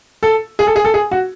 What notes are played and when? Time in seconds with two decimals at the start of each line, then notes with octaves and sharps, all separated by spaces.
0.23 A4
0.59 G#4
0.67 A4
0.76 G#4
0.85 A4
0.94 G#4
1.11 F#4